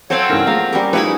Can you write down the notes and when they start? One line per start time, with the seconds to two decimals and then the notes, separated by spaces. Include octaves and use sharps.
0.10 F#3 C4 A4 C5 C#5 F5
0.29 G2 C#3 E3 A#4
0.47 F3 G#3 A#3 F5 A#5
0.73 G3 C#4 G4 A#4
0.93 F3 G3 C#4 D#4 E4 G#4 B4 C#5